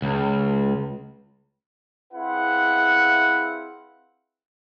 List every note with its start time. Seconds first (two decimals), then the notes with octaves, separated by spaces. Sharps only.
0.02 C#2
2.14 C4 E4 G#4 B4 F5 F#5